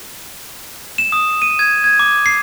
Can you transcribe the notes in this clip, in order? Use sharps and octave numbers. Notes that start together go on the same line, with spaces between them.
E7
D#6
D#7
G#6
G#6
D6
C7